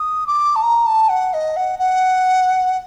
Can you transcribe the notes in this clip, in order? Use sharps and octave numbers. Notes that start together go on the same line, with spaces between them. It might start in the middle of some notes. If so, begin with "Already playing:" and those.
Already playing: D#6
D6
A5
A#5
A5
F#5
D#5
F#5
F#5